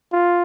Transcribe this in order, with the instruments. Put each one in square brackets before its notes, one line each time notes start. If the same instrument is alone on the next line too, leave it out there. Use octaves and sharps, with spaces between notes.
[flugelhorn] F4